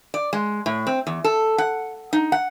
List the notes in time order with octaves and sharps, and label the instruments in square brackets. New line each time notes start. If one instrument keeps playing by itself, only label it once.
[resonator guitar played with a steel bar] D5
G#3
A2
C4
E2
A4
F#5
D#4
F#5